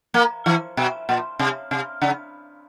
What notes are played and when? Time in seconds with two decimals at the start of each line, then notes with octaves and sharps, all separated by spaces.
0.14 A#3
0.46 E3
0.77 B2
1.09 A#2
1.39 C3
1.71 C3
2.02 C#3